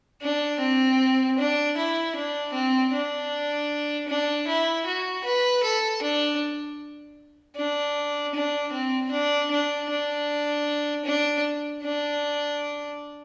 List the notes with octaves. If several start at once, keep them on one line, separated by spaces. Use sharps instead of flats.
D4
C4
D4
E4
D4
C4
D4
D4
E4
F#4
B4
A4
D4
D4
D4
C4
D4
D4
D4
D4
D4